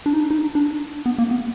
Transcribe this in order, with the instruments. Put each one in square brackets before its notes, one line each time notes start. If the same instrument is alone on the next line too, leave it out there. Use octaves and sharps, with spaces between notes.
[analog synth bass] D4
D#4
D4
D#4
D4
B3
A#3
B3